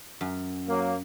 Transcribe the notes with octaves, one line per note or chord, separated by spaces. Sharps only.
F#2
F#3 A#3